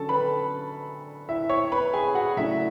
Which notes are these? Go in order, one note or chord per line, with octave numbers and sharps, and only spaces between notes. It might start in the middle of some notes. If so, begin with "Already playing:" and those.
Already playing: D3 F#3 C#4 A4 A5
B4 B5
E4 E5
C#5 C#6
B4 B5
G#4 G#5
F#4 F#5
C#3 F#3 A3 D4 E4 E5